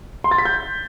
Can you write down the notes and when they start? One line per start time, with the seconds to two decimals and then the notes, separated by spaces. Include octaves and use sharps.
0.24 C6
0.31 A6
0.38 B6
0.45 G6